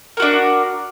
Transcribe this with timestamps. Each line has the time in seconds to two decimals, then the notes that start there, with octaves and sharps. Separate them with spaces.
0.17 A#4
0.20 F#4
0.22 D4